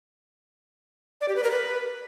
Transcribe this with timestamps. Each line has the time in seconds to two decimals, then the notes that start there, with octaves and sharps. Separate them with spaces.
1.21 D5
1.29 G4
1.36 B4
1.43 A#4
1.51 B4